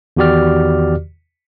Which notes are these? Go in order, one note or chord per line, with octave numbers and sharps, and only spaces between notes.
E2 D#3 F#4 G4 D5 F6